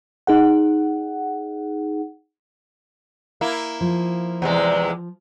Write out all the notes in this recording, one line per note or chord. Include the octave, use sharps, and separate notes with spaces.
D#4 G#4 F#5
A#3 E4
F3
E2 C3 G#3